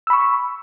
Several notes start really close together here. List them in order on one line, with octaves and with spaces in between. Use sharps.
E6 B5 C#6